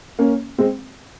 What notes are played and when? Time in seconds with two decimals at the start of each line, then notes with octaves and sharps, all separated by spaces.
0.19 A#3 C#4
0.58 G#3 C4